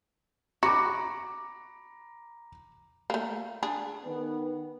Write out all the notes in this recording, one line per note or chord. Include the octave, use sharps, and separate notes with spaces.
F#4 A#5 B5 D6
A3 A#3
D4 G#4
D#3 B3